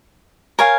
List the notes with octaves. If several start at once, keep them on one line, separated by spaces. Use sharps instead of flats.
A#4 C#5 F5 G#5